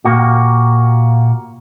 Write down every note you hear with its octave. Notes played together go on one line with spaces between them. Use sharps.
A#2 A#3 F#4 G4